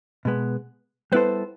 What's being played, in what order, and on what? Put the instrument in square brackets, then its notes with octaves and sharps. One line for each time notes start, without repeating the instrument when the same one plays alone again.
[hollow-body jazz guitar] B2 G#3 B3
[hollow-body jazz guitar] G3 B3 E4 A4 C5 [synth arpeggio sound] B4